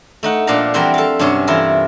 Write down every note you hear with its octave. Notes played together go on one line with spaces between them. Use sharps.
A3 D#4 F#5
A#2 F3 D4 A4 F5 A#5
E3 F3 G3 C4 F#4 A#4
A4 F5
G2 C3 F#3 C#4 A4 C6
C3 E3 E4 F4 A#4